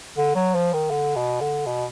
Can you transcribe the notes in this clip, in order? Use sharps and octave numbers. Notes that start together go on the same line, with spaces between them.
D3
F#3
F3
D#3
D3
B2
D3
B2